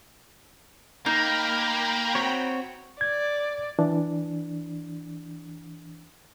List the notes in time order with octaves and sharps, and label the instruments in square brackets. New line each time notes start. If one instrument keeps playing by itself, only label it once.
[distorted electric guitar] A#3 [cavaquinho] D#4 [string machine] G5 A#5 B5
[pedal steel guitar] C4 F#4 C#5
[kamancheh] D5 [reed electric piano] G#6
[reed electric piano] E3 D4